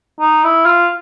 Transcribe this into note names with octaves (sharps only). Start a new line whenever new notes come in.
D#4
E4
F4